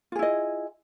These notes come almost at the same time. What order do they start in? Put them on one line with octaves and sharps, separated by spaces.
F4 G#4 E4 D#5